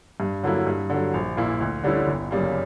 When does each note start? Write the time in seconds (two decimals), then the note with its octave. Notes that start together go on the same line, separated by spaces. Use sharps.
0.20 G2
0.43 D3 F#3 A#3 E4
0.67 G2
0.90 D3 F#3
1.14 A#1
1.37 A#2 A#3 E4
1.61 D2
1.84 D3 G3 C#4 E4
2.08 G1
2.31 F#2 C#3 G3 A#3